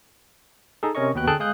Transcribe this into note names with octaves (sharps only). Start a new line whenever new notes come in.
D#4 G#4 A4
C3 C#4 A#4 C#5 D#5 C#6
D#2 B3 F#4 B4 G5 F#6
D3 G#4 A4 G5 A5 F#6
G#3 F5 G#5 D#6 F#6 G6